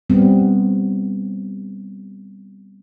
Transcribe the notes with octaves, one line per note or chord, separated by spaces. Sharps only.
G3 B3 C4